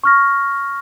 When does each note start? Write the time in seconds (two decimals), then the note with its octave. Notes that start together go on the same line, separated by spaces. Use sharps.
0.04 C#6 F6 A#6